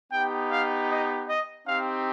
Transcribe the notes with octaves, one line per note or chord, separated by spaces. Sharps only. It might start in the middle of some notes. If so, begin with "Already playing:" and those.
B3 D#4 G4 G5
F5
D#5
D#5
C4 D#4 G4 F5